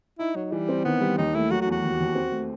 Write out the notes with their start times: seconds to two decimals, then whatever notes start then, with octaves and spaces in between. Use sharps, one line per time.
0.19 D#4 E4
0.35 F#3 D#4
0.52 E3 G3
0.69 C4
0.85 D#3 B3
1.01 G3
1.18 D#2 D#4
1.35 A3 E4
1.50 F#3 F#4
1.61 F#4
1.66 E2
1.72 F#4
1.84 D#2
2.00 D#2
2.15 C4
2.32 A3